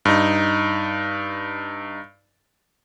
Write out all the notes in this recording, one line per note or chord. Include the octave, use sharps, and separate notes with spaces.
G2 D#4